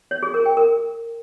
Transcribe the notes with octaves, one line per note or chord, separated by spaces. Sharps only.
C#5
G#4
A#4
G5
A#4